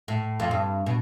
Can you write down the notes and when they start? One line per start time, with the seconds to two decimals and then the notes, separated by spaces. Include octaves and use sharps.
0.08 A2
0.40 F2
0.51 G2
0.86 B2